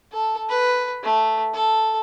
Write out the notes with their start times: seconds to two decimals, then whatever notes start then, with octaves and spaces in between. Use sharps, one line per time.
0.12 A4
0.50 B4
1.04 A3
1.54 A4